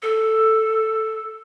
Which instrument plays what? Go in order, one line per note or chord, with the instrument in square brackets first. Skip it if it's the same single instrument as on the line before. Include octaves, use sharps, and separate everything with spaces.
[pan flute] A4